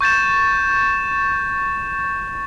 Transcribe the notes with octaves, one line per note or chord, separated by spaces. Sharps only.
C#6 G6 A6 E7